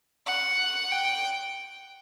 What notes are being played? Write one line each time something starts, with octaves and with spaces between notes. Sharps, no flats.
F#5
G5